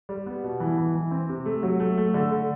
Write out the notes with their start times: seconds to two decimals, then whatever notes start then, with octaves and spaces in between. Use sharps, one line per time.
0.09 G3
0.26 B3
0.44 B2
0.60 E3
0.77 E3
0.95 E3
1.11 C4
1.29 C3
1.46 A3
1.63 F#3
1.80 A3
1.97 A3
2.14 D3
2.31 D3